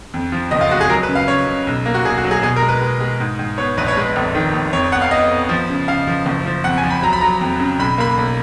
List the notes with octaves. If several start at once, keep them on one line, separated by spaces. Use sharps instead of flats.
F2
F3
F#1 D#5
F4
G#3 F#4
G#4
F#3 A#4
B4
C#3
F5
C#3 C#5
C#3
B1
A#3
F#4
B1 G#4
F#4
F#3
G#4
B2 G#4
A#4
G#3
B4
G#3
G#3
G#2
G#2
B3 C#5
A#1 B4
C#5
G#3 B4
F1
D#3
F1
F2 C#5
B3 F#5
F5
B3 D#5
B3
F3
C#3
C#3 F5
F3
F#1
F3
F2 F#5
G#5
F3
B5
F#3 A#5
B5
F#3 A#5
F2
C#3
B1 B5
A#3 B5
B1